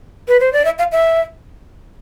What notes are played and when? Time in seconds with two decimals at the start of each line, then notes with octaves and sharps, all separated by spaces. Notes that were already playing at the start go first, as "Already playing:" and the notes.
0.28 B4
0.40 C5
0.53 D5
0.65 E5
0.79 F5
0.92 E5